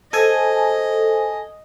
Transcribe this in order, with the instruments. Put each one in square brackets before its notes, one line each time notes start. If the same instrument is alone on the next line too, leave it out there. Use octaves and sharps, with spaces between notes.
[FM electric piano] A4 G#5 [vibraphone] C5 [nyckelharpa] D#5